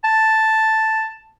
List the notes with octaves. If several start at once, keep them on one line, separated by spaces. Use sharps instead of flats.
A5